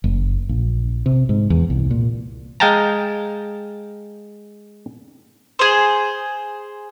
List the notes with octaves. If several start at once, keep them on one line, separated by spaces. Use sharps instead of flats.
F#1
A#1
C3
G#2
E2
C2
A#2
G#3 F5 G5 A5 A#5
G#4 C5